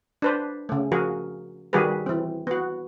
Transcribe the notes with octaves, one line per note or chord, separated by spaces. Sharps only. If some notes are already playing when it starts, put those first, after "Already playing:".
D4 B4 C5
C#3 A3
F3 F#4 G#4 A#4
D#3 G3 F#4 G#4 A#4 B4
E3 C4
B3 F#4